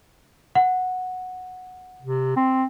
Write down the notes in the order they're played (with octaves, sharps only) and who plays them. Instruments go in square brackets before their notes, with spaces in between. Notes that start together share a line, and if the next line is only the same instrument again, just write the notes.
[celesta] F#5
[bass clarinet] C3
C4